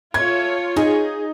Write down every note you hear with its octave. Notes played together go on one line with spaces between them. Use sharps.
A3 F4 C#5 G#6
D#4 G#4